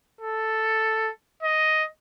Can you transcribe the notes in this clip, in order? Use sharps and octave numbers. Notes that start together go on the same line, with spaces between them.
A4
D#5